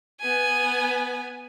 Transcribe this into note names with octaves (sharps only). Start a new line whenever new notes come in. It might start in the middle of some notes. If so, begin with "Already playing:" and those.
B3 G#5